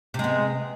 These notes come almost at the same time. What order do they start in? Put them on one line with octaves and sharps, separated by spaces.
C3 G#3 B3